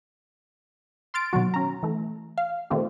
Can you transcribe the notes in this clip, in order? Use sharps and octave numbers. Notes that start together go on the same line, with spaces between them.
C6 F6 A6 D7
B2 D#3 F#3 F#4
C#4 A#5
E3 A3
F5
B2 D#3 A3 C4 F4 G4